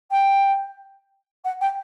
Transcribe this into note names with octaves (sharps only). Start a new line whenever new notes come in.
G5
F#5
G5